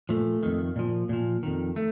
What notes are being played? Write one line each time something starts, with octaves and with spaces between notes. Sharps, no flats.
A#2 F3 A3
F2 D#3
A#2 F3
A#2 F3
F2 D#3
A3